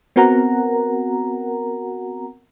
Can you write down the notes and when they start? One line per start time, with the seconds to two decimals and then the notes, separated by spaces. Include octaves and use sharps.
0.16 B3 C4 F#4 A#4 F#5 A#5